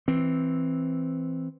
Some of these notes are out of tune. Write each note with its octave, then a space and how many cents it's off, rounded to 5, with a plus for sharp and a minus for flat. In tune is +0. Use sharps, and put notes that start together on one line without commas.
E3 -5 C4 +0